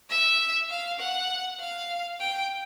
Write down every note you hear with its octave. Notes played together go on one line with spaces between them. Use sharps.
E5
F5
F#5
F5
G5